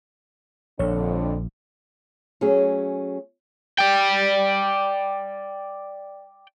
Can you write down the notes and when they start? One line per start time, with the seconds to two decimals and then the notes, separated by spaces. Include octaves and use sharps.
0.79 A#1 F2 D3 C#5
2.41 F#3 A3 C#4 G#4
3.79 D5 G5